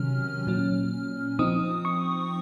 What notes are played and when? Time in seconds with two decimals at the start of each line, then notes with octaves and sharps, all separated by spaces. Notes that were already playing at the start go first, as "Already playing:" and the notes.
Already playing: C3 D#3 F#3 C#4 F6
0.47 A#2 F#3 C#4
1.39 F3 C4 D#4 D#6
1.85 C#6